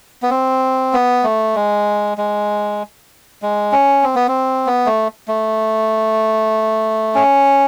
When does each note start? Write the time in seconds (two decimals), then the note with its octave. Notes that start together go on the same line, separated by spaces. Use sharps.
0.22 B3
0.31 C4
0.93 B3
1.23 A3
1.55 G#3
2.18 G#3
3.42 G#3
3.72 C#4
4.03 C4
4.15 B3
4.28 C4
4.67 B3
4.86 A3
5.28 A3
7.15 C#4